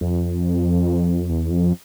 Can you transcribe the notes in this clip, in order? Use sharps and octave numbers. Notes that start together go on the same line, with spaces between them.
F2
E2
F2